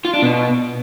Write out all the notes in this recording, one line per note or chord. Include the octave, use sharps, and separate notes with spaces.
F4
D4
B2